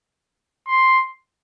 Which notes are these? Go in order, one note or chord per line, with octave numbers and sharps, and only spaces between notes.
C6